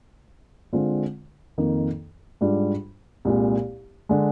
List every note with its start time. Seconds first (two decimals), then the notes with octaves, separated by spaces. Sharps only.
0.73 D3 G#3 C4 F4
1.58 F2 D#3 A#3 D#4
2.41 G#2 G3 D4 F4
3.25 C2 A#2 G#3
4.09 D3 G#3